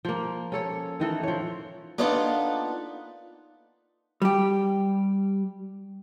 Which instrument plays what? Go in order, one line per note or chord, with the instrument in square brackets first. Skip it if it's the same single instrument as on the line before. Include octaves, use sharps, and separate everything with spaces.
[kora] F3 A#3
C#4 A4 C#5
D#3 E3 A4
F3 C#5
[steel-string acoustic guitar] A#3 B3 D4 D#4 F4 A4
[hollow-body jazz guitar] G3 G4